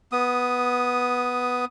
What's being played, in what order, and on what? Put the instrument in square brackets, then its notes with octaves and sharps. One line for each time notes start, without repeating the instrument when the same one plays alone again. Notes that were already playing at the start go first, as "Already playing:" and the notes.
[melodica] B3 D#6